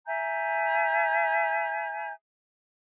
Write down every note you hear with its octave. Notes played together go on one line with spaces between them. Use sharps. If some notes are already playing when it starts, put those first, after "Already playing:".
E5 G#5 A#5 G6